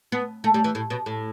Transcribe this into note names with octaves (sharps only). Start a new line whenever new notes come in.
B3
A3
G3
E3
A2
B2
A2